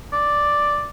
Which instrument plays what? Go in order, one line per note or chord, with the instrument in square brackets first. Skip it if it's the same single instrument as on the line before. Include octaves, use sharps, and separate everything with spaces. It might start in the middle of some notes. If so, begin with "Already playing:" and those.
[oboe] D5